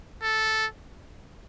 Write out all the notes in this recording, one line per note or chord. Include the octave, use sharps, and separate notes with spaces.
A4